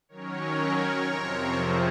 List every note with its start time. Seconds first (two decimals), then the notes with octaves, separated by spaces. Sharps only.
0.09 D#3 F#3 C#4 A#4 C#5
1.07 F2 C3 F3 C4
1.55 G#4 C5